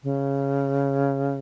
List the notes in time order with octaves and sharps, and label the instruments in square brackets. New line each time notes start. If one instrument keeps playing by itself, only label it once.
[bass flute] C#3